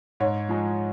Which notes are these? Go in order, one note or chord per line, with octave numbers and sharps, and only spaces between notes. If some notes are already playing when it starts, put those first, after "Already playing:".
G#2 C#5
F3 G#3